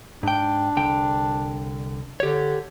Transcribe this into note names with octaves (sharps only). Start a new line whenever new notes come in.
G#2 D4 G5
C2 D3 G5
D3 G4 C#5